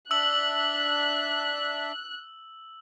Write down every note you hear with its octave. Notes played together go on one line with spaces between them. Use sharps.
D4 E5 E6 F#6 F#7